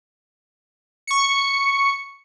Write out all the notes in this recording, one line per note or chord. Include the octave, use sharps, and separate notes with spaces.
C#6 C#7